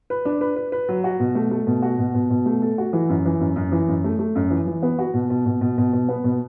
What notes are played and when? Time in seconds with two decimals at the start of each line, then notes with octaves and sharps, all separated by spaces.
0.10 B4
0.25 D4
0.41 B4
0.56 B4
0.72 B4
0.89 F#3
1.04 F#4
1.20 B2
1.35 A3
1.51 A3
1.67 B2
1.82 F#4
1.99 B2
2.14 B2
2.30 B2
2.46 A3
2.62 A4
2.78 F#4
2.93 E3
3.09 F#2
3.25 E3
3.40 F#2
3.56 F#2
3.72 E3
3.88 F#2
4.04 A3
4.19 A3
4.35 F#2
4.50 E3
4.67 E3
4.83 B3
4.99 F#4
5.14 B2
5.30 B2
5.46 B2
5.61 B2
5.78 B2
5.93 B2
6.09 B3
6.24 B2